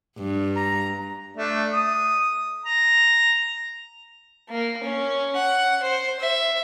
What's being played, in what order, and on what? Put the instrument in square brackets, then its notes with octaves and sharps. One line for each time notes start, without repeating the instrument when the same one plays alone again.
[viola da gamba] G2
[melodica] A#5
[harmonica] A3 D4
D#6
A#5
[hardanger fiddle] A#3
C#4
F#5
C5
E5